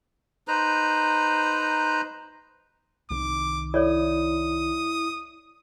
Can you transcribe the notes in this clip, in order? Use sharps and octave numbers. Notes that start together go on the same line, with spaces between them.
D#4 B4 C5 A#5
C2 D#3 D6
E4 A4 C#5 D5 D#6